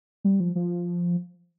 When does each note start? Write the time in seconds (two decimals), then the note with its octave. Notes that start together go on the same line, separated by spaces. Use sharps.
0.24 G3
0.40 F3
0.55 F3